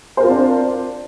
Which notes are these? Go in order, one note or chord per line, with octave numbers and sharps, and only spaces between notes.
C4 D4 F4 A#4 C5